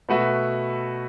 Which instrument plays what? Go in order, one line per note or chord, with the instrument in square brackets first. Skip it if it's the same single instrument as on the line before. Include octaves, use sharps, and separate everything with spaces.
[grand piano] B2 A3 F#4 B4 E5